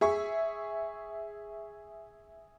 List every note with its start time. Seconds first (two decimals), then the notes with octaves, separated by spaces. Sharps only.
0.01 G#4 E5 C#6